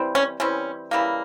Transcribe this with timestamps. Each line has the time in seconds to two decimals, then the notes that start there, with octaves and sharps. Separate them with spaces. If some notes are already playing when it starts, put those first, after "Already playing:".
Already playing: E3 G3 C4
0.15 C#4
0.40 E3 G3 C4 C#4
0.91 C#3 E3 G3 A#3